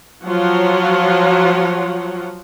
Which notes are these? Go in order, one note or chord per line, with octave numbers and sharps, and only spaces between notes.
F3 F#3 F4 C#5 F#5